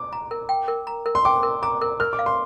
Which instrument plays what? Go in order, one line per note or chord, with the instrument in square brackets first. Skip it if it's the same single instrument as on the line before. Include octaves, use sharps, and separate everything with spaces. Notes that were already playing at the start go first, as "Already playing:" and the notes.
Already playing: [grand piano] D6
[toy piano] A#5
A#4
G5
A#4
A#5
A#4
[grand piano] C6
[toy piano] G5 [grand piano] D6
[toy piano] A#4
[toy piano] A#5 [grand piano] D6
[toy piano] A#4
[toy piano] A#4 [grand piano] F6
[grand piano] D6
[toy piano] F5
[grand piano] C6